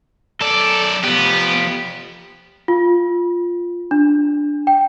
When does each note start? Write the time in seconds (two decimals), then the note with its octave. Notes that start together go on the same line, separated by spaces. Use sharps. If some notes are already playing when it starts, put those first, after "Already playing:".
0.41 F#2 A4 D5
1.04 F3 B3 G4
2.68 F4
3.91 D4
4.67 G5